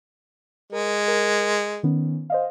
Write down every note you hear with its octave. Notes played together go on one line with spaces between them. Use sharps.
G#3 A#4
A#4
D#3 B3 C#4
C5 D#5 F5